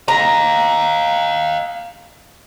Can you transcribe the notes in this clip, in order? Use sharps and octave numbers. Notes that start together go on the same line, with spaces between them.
D#5 F5 A#5